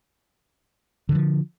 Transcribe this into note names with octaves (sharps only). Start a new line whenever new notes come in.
D3 D#3 F3